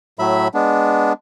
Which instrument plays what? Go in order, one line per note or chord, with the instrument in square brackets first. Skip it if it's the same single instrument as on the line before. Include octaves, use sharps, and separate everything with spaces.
[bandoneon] A2 F#3 E5 B5
G#3 B3 D4